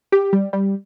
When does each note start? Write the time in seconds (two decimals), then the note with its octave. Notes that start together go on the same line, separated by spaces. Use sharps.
0.12 G4
0.33 G3
0.53 G3